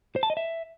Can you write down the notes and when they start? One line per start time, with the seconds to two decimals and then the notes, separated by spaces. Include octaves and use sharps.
0.16 C5
0.23 A5
0.30 D#5
0.37 E5